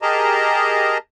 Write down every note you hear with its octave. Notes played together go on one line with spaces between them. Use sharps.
G4 G#4 A#4 D#5 A5 A#5